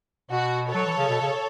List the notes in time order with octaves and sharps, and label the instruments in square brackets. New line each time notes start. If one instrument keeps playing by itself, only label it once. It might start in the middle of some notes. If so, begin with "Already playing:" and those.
[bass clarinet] B2 [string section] F#4
[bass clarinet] F#3 [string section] A4 C#5
[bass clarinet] E3
C#3
B2
C#3